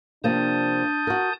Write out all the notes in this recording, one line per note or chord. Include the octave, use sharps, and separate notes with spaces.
C3 F3 A#3 D4 A5 D#6 G6
F#4 A#4